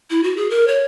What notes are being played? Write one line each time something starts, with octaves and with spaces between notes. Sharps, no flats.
E4
F#4
G#4
A#4
C#5